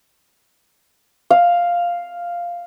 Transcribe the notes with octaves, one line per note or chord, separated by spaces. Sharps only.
F5